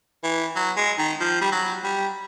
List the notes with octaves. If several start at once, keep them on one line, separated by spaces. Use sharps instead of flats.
E3
F#3
G#3
D#3
F3
G3
F#3
G3